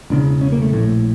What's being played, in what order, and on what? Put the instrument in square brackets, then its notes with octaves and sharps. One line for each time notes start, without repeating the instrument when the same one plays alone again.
[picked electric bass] E1 E2 C#3 D4
C#4
A#3
A3
A#1 A2